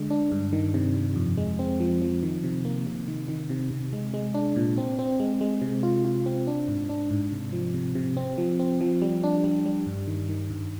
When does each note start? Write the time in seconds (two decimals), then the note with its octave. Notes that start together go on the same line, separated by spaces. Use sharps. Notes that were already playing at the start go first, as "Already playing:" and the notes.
Already playing: D3 G#3
0.11 D4
0.32 G2
0.53 D#3
0.74 C3
0.95 C3
1.16 F2
1.37 G#3
1.59 C4
1.80 F3
2.02 F3
2.23 D#3
2.44 C3
2.65 A#3
2.87 C3
3.08 D#3
3.28 D#3
3.50 C3
3.71 C3
3.93 G#3
4.14 G#3
4.34 D4
4.56 A#2
4.78 C4
4.99 C4
5.20 G#3
5.41 G#3
5.62 C3
5.83 F4
6.05 F4
6.26 C4
6.47 D4
6.68 G#2
6.89 D4
7.11 G#2
7.32 C3
7.53 F3
7.74 C3
7.95 C3
8.17 C4
8.38 F3
8.59 C4
8.81 F3
9.02 G3
9.23 D4
9.44 G3
9.66 G3
9.86 G2
10.07 D#3
10.29 D#3
10.50 G2